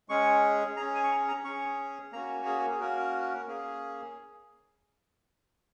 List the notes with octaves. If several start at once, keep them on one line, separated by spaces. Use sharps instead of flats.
G#3 C#4 G#4 C#6
C#4 G#4 A#5
G#5
C#6
A#5
A#5
C#4 G#4 C#6
A#3 C#4 F#4 A#5
G#4
G#4
A#3 C#4 F#4 A#4
A#3 C#4 G#4